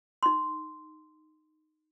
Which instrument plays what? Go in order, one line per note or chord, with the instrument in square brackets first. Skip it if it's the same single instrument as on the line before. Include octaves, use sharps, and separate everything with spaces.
[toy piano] D#4 C6